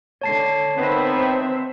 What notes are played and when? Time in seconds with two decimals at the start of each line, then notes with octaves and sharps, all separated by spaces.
0.21 D3 C#5 A5 C7
0.77 D#3 B3 C4 B4 C5 E5